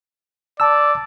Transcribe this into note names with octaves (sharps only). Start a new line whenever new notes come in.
D5 A5 E6